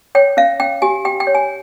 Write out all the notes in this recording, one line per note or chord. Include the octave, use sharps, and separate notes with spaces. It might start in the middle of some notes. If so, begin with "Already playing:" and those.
C#5 G5
C#4 F5
C#4 G5
G4 G#5
G4 G5
G5
C#5
G#5